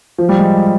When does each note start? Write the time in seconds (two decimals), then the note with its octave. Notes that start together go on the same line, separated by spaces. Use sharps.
0.18 F3
0.29 G3
0.39 G#3